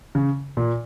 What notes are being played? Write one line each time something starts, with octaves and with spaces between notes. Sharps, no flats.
C#3
A#2